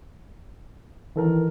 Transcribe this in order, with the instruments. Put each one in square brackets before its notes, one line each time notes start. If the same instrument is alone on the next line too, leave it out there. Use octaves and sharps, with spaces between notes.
[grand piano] D#3 A4 A#4 [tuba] E3